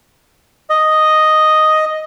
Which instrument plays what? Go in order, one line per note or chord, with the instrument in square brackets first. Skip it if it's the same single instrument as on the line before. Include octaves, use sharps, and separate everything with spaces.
[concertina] D#5